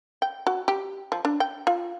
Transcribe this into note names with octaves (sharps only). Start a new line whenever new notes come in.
G5
F#4
G4
F3
D4
G5
F4